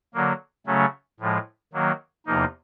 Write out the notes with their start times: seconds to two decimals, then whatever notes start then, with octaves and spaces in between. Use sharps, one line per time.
0.14 D3 F#3 A#3
0.67 C#3 F#3 A3 C#4
1.20 A2 F3 G#3
1.73 D#3 F#3 A#3
2.26 E2 C3 F3 A#3 D#4